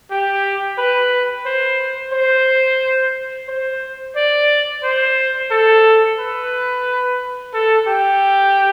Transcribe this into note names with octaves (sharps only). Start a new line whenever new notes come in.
G4
B4
C5
C5
C5
D5
C5
A4
B4
A4
G4